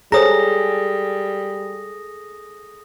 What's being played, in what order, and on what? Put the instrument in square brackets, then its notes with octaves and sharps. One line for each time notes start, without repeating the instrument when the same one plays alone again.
[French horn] G3 [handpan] G#4 A4 [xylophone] C5 C#5 A#5 [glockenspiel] D#6 A#6